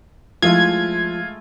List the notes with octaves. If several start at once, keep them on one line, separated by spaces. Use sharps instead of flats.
F3 G#3 A3 E4 F4 G#6